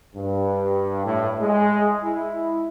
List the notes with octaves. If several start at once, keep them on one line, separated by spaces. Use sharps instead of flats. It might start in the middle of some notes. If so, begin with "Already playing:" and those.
G2
A2
G#3
E4